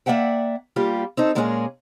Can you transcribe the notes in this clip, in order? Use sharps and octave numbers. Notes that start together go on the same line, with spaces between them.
A#3 D5 E5 F#5 G5
G3 A#3 F4 G4
C4 D#4 A4
A#2 G#3 A#3 C#4 F#4 G#4